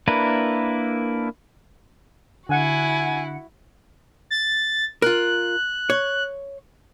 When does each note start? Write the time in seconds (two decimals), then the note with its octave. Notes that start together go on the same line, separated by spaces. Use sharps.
0.08 A#3 D4 E4 A#4 B4
2.49 D3 E4 F#4 F#5 G#5 C#7
4.30 A6
5.02 F4 A#4 F#6
5.90 C#5